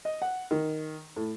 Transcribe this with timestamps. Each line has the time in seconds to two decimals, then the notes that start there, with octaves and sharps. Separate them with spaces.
0.05 D#5
0.22 F#5
0.51 D#3
1.16 A2